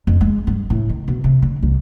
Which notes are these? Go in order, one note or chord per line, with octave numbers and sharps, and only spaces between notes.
F2
G#3
G2
A2
D#3
B2
C3
D3
C2